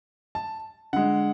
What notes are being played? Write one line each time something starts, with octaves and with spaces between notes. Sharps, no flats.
A5
D3 G#3 F#5